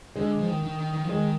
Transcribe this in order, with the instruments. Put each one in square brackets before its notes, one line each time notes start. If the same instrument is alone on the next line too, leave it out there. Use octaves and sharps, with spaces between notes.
[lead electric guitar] D3 [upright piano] G#3
[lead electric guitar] F3
D#3
D#3
D#3
D#3
F3
[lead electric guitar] D#3 [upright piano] G#3